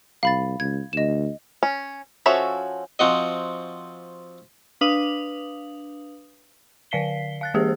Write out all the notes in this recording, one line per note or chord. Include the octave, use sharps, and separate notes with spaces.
C2 F5 B5 A6
C#2 G#6
D2 D#5 E7
C#4
F3 C#4 F#4 A4 E5
F3 C4 F#4 D#5
D4 B4 F5 D#6 F7 F#7
D3 D5 F5 B6 C7 G7
F5 F#6 A6
E3 A#3 G4 G#4 C5